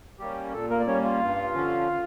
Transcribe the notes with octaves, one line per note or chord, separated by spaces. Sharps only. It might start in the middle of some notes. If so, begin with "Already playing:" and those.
G3 A#3 C#4 G4
A#2 A4
A#3 A#4
D5
G3 A#3 C#4 C#5
F4 F5
G2
D3 F3 C#4